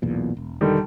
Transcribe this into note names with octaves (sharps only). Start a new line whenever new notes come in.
B1 E2 A#2
E1
D3 D#3 G3